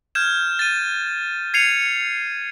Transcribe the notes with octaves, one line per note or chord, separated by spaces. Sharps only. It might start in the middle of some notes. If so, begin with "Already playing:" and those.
F6 G6 G#6 E7
A6 D#7
G#6 C7 C#7 D#7 F7